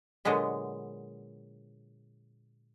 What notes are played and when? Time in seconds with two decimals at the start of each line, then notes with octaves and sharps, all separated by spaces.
0.25 A#2 D3 F#3 G#3 B3